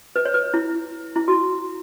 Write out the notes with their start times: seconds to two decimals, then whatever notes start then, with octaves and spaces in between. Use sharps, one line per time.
0.16 B4
0.25 C#5
0.34 B4
0.54 E4
1.16 E4
1.28 F#4